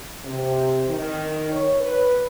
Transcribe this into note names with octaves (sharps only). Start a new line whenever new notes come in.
C3
D#3
C#5
B4